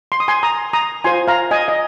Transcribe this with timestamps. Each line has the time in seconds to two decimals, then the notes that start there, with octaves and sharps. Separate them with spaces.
0.12 C6
0.20 D#6
0.28 G#5 C6
0.43 A#5 D#6
0.73 A#5 D#6
1.04 F4 C5 G#5 C6
1.28 F5 A#5
1.51 D#5 G#5
1.68 D#5